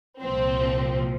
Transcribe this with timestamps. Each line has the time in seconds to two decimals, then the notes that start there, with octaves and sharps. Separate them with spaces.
0.19 C2 A#2 F3 C4